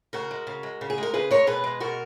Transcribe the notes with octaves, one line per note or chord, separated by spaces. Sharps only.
C#3 F#4 A#4
G#3
C#3
G#3
C#3
G#4
G#3 A#4
C#3 G#4 B4
G#3 A#4 C#5
B2 G#4 B4
G#3
B2 F#4 A#4